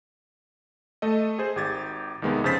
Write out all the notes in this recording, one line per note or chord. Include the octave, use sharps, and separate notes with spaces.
A3 A4 D#5
G#4 C5
G#1 G4 G#6 A6
C2 D#3 G#3 B3
F2 C#3 C5 A6 B6